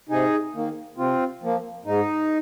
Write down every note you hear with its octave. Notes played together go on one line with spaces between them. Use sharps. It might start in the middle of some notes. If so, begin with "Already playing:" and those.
C3 D#4 G#4
D#3 A#3
C3 C4 F4
F3 A#3
G#2 D#4